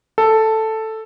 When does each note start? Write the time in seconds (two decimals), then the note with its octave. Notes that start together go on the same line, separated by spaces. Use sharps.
0.18 A4